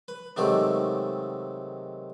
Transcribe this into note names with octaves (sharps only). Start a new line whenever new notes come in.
B4
C3 D#3 F#3 G#3 A3 G4